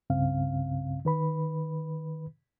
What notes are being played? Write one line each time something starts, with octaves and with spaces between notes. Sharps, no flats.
C2 G2 C#3 C4 F5
D#3 B4 B5